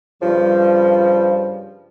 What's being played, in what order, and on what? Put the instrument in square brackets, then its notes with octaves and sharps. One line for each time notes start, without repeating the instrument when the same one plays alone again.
[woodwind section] G2 C#3 F3 G3